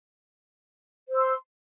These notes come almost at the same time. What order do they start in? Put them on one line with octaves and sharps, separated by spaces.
C5 E6 C6